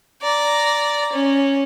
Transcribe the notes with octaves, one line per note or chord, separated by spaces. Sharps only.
D5 A#5
C#4